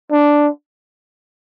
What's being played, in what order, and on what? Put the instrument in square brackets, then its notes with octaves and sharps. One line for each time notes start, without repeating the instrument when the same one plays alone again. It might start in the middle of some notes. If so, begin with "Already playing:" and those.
[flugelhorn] D4